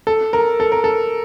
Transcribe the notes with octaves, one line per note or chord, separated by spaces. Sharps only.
A4
A#4
A4
A#4
A4